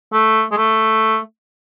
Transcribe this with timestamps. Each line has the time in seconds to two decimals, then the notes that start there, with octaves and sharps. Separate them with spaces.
0.13 A3
0.52 G#3
0.57 A3